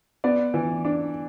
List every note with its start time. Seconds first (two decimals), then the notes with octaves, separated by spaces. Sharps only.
0.24 B3 D5
0.54 E3
0.85 D4